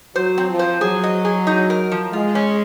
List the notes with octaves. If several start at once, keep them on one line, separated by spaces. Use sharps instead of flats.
F#3 C5
C4
F3
C5
F#3 G#4
D#5
G#4
D#4
A#4
F3
G#3 F4
C#4